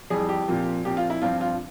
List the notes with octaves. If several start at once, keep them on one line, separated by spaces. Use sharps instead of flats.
F2 E3 G3 G#4
G4
A#2 F3 C4
A#2 F3 C4 G4
F4
E4
G2 F3 C4 F4
F4